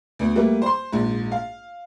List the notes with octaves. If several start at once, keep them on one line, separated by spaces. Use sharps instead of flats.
D2 B3
G3 A3 A#3 B4
C5 C6
A#1 G#2
F5